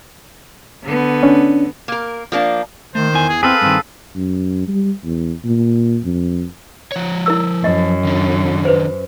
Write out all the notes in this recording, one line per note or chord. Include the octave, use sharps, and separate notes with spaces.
D3 B3
C#4 D4
A#3 A#4
F3 A#3 D4
D#3 A3 C5
E2 E3 G#5
G#4
C4 G#4 A4 B4 F5
G2 D#3 C4
F#2
G3
E2
A#2
F2
F3 C#5
E4 A#4 E6
F#2 D#5
D#3 D4
B4 C5